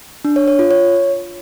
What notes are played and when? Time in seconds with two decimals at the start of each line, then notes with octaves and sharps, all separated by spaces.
0.25 D4
0.36 C#5
0.48 C#5
0.59 F4
0.71 C#5